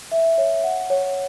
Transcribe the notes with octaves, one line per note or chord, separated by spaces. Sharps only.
E5
C#5
F#5
C#5